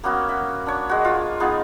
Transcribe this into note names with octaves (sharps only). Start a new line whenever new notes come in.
A#3 B3 C#4 F#4
E5
D4 C#5
G#3 F#4
F4
B3 D#4 F4 G#4